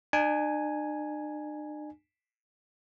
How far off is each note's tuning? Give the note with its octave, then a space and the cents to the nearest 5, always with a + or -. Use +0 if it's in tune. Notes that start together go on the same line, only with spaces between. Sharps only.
D4 +45 G#5 +0